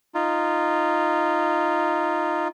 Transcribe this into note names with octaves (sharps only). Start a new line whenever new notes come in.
D#4 F4